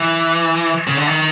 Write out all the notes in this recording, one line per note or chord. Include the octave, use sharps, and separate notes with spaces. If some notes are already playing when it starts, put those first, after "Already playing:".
Already playing: E3
C#3
D3
D#3